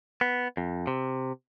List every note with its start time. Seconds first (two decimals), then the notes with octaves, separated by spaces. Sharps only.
0.21 B3
0.57 F2
0.87 C3